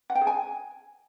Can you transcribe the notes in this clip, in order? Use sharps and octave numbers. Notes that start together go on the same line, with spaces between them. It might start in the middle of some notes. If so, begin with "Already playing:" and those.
F#5
G5
G#4
G#5